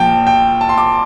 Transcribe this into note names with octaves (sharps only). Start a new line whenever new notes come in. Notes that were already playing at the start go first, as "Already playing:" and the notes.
Already playing: A#1 A#2 F3 G5 A5
G5
A5
C6
D6